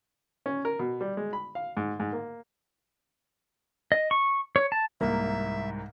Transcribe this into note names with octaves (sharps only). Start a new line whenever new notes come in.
C#4
A#4
B2
G3
G#3
B5
F5
G#2
G#2
A#3
D#5
C#6
C#5
A5
C2 G#2 A#3 E5